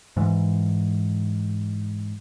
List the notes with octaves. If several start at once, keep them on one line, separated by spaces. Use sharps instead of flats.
G#2 E3